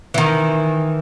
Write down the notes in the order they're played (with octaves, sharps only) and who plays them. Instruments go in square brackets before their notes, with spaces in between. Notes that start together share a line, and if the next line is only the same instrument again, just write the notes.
[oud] D#3 E3